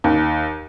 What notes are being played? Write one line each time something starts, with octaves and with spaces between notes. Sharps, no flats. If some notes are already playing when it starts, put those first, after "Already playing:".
D#2